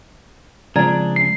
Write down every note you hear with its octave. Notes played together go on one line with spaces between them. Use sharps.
C#3 F3 G#3 C4 D4 D5 A#5 G#6
C7